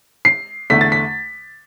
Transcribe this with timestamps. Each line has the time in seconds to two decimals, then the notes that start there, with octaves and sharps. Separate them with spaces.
0.25 C7
0.70 E2 D3 A3 B6
0.81 A6
0.92 B6